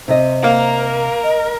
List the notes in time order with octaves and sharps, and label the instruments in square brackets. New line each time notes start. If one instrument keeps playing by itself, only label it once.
[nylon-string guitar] C3 D#5 [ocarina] C5
[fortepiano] A#3 [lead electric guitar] A#4
[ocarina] D#5